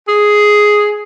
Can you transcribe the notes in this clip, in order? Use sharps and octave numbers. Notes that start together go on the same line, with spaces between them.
G#4